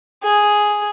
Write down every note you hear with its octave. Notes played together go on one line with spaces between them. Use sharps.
G#4